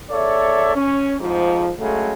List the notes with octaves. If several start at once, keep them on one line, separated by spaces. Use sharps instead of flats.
E2 A4 C#5 D5 E5
C#4
F2 G#2 F3
C#3 F#3 G#3 A3